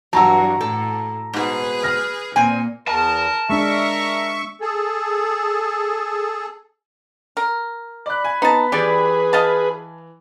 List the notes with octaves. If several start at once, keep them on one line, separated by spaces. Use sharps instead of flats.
G2 E3 F#3 F#4 A5 A#5 E6
A2 A4
G#2 B2 G#4 B4
F6 A#6
A#2 C4 G#5
E2 A#4 A5
G#3 D4 A#4 E5 C#6
G#4 A4
A#4
D5 B5 F#6
G#5
B3 D#4 A5
E3 G3 G4 G#4 B4 D5 G#6
D#5 F5 A5